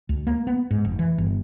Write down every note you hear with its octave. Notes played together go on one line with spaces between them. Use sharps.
D2
A#3
B3
G#2
F1
E3
G1